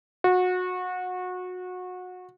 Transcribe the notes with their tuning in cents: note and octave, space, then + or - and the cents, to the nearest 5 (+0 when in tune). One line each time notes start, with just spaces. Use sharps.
F#4 -25